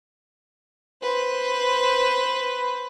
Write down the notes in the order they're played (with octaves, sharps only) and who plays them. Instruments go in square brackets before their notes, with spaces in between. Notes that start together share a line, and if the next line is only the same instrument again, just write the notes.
[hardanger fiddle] B4 C5